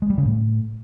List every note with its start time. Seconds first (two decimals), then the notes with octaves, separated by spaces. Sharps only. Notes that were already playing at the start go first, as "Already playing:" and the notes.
0.02 G#3
0.10 G3
0.18 C#3
0.25 A2